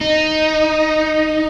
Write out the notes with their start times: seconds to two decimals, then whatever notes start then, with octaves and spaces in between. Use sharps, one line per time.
0.01 D#4